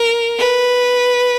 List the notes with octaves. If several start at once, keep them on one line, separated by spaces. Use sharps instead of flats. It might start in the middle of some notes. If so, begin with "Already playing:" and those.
Already playing: A#4
B4